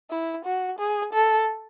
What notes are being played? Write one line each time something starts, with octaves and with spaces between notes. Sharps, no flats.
E4
F#4
G#4
A4